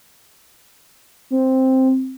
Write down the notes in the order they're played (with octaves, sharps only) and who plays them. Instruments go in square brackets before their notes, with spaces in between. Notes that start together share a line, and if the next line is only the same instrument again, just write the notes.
[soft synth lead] C4